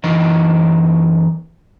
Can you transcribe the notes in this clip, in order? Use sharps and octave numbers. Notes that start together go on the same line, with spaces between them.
F#2 E3 D#4 D#5